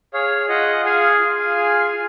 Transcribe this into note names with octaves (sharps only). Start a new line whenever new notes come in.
G#4 C#5 F5
F4 D#5 F#5
G#4 F5 G#5
F4
G#4
F4